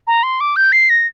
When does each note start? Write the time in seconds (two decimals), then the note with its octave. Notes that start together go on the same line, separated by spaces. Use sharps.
0.07 A#5
0.23 C6
0.40 D6
0.56 G6
0.72 C7
0.89 A#6